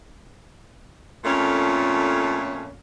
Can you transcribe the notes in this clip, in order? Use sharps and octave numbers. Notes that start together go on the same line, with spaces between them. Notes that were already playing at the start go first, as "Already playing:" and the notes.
F2 A#2 A3 C#4